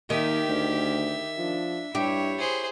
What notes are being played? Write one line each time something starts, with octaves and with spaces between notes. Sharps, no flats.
D#2 D#3 G4 E5
D2
F3 D4
G2 E4 G4 C#5
G#4 C5